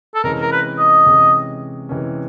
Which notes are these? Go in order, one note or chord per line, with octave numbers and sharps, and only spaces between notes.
A4
C3 E3 G#3 C#4 A#4
A#4
B4
D#5
C3 E3 G#3 C#4
C3 E3 G#3 C#4